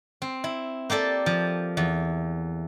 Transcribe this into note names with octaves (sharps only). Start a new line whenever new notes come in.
C4
E4
A#3 G4 A4 D5
F3
E2